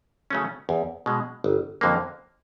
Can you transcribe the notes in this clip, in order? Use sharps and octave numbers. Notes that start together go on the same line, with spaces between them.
C#3 F#3 A3 C#4
E2
B2 G#3
G1
F2 D3 F#3 A#3